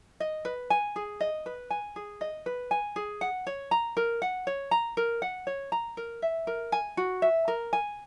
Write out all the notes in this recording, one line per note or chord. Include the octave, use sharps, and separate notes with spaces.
D#5
B4
G#5
G#4
D#5
B4
G#5
G#4
D#5
B4
G#5
G#4
F#5
C#5
A#5
A#4
F#5
C#5
A#5
A#4
F#5
C#5
A#5
A#4
E5
A#4
G#5
F#4
E5
A#4
G#5